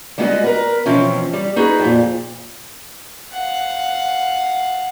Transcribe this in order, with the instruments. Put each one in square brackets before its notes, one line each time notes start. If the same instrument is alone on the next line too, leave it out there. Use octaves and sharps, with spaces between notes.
[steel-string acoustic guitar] G3 G#3 B3 E4 F#4 D#5
A#4 B4
B2 E3 F3 C4 C#4
G3
D#4 F#4 G#4 B4
F2 A#2
[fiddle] F5 F#5